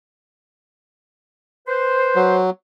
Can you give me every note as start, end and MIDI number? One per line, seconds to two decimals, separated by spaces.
1.67 2.38 71
1.67 2.38 72
2.15 2.50 54